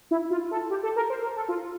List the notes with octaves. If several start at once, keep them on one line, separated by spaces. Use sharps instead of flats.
E4
F4
A4
G4
A4
A#4
C5
A#4
A4
F4